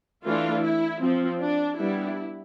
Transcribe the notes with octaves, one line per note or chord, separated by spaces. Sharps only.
E3 A3 D4 F4
E4
F3 C4
D4
G3 B3 D4 E4